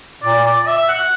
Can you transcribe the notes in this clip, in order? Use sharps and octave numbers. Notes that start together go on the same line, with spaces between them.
A#2 D5
D5
E5
E5
F#5
F#5